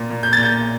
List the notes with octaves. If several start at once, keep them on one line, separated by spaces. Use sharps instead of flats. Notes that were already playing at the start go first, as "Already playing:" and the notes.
Already playing: A#2
A#2
G6
A6
A#2
G6